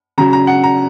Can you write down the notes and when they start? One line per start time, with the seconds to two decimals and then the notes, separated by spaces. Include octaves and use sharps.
0.18 C#3 F#3 A#5
0.33 A#5
0.47 F#5
0.64 A#5